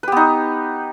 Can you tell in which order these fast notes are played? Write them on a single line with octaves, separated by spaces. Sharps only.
B4 G4 B3 D#4